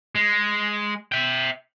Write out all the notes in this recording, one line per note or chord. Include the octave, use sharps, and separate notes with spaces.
G#3
E5 G5